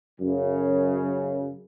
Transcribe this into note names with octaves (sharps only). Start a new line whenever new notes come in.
F#2 C#3